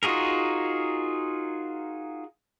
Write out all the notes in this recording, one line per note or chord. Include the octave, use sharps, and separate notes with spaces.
D#4 F4 F#4 G#4 A#4